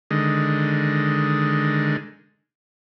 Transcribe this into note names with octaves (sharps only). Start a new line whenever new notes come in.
D3 D#3 G#3